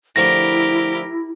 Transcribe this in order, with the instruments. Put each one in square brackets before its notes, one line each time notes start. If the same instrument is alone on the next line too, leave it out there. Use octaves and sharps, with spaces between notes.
[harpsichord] D3 F3 A3 [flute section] E4 [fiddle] G4 A#4 [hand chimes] A#6